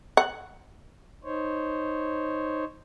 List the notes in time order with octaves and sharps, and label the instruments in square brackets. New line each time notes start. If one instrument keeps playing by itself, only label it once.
[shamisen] F#5
[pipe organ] D#4 C5 C#5